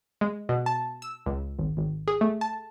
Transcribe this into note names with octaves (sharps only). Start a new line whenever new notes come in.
G#3
B2
A5
E6
C#2
G#1
G#1
G#4
A3
A5